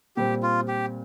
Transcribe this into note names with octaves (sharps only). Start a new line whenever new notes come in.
A#2 G3 C4 G4
F4
G4